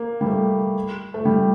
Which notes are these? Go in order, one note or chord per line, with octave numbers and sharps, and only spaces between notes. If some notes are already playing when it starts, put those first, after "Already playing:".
Already playing: A#3
G3
A3
A3
G3